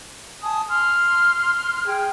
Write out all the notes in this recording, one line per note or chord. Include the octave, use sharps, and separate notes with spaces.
G#5 A5 D#6
C6 F6
G#4 G5